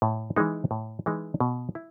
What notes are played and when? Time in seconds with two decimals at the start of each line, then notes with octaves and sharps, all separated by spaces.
0.02 A2
0.36 E3 G#3 D#4
0.71 A2
1.06 E3 G#3 D#4
1.40 B2
1.75 E4